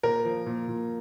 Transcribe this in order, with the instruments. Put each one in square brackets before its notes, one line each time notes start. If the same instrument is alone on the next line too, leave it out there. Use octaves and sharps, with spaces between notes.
[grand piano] A#2 [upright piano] A#4
[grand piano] F3
A#2
A#2